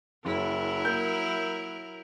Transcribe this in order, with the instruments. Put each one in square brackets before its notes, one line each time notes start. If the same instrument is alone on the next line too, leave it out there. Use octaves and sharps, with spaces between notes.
[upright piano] F#1 [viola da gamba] F#3 E4 A#4
[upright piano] A#3 G6